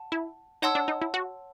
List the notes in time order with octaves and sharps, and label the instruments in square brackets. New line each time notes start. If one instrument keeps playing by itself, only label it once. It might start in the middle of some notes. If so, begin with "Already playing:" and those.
Already playing: [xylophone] F#5 A5
[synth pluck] E4
[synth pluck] D#4 [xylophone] C#5 F#5 A5 C6 E6
[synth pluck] D4
D#4
E4
F#4